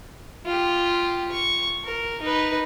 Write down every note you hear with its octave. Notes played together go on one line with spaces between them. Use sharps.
F4 G4
C#6
A#4
D#4 B4